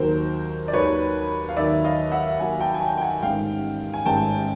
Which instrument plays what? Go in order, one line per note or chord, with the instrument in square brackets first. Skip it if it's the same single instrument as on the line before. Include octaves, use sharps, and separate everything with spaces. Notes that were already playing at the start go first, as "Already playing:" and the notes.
Already playing: [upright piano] D#2 D#3 F#3 A#4 C5
D5
D#2 D#3 F#3 B4 C#5
F5
D#2 D#3 F#3 D5 E5
D#5 F5
E5 F#5
D#2 D#3 F#3 F#5 G#5
G5 A5
G#5
G5 A5
G5
F#5 G#5
A1 G#2 D#3 G3 F5 G5
G#5
A1 G#2 D#3 G3 G5 A5